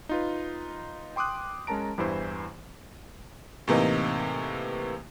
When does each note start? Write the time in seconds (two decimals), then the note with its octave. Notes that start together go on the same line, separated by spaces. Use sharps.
0.09 D#4 F4 B4
1.16 G5 C6 D6 D#6 F#6
1.67 G#3 C#4 A#4 A5 A#5 D7
1.98 E2 G2 E3 E4 C5
3.68 A2 C3 E3 A#3 D#4